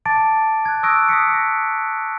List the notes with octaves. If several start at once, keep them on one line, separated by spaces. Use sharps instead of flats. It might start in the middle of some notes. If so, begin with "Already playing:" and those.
A5 D6 A6 D7
F#6 G#6
C#6 D#6 E6 F#6 A#6 D7
D#6 E6 A#6 B6 C#7
D#6 A#6